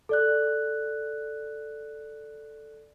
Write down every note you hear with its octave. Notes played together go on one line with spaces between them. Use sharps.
A4 D5 F#6